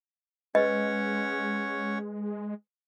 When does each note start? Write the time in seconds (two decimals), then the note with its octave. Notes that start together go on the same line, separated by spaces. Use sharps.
0.55 G#3 C#4 B4 C#5 D#5 F#5